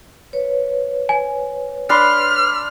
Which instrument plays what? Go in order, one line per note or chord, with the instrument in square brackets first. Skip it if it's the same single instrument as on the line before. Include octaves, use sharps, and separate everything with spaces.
[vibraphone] B4 C#5
[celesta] G#5
[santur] D4 B5 C6 [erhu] F6